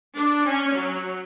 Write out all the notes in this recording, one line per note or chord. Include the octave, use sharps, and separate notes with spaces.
D4
C#4
F#3